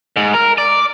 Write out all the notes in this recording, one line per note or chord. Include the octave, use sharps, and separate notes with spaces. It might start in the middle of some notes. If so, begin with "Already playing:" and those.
G#2
A#4
D5